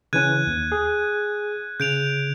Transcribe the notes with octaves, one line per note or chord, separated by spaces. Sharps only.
C#3 E3 C#4 F#6 G#6 D#7
D#2
G#4
C#3 G6 D7 F7